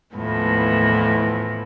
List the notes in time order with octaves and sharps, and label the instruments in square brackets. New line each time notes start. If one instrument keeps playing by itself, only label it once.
[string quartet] D#2 A2 E3 F3 B3